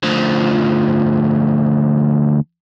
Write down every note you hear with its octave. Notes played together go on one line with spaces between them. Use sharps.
D2 F3